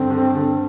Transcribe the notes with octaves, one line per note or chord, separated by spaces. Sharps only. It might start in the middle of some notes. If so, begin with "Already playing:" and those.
Already playing: G2 D3 C4
D3
D3